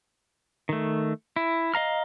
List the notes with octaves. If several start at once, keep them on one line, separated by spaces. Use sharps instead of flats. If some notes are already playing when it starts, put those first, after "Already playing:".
D#3 A3
E4
D#5 F5 A#5 F6